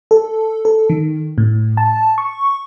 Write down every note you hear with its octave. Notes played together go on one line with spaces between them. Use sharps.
A4
A4
D#3
A2
A5
C#6